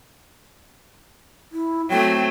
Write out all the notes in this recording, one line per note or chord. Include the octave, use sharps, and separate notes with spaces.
E4
F#3 A3 C4 G5